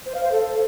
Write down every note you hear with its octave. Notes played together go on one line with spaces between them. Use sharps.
C5
F5
C5
A4